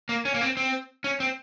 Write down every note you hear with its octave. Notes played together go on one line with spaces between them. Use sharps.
A#3
C#4
A#3
C4
C4
C#4
C4